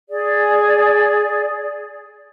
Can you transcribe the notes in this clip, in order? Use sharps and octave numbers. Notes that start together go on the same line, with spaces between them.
G#4 D5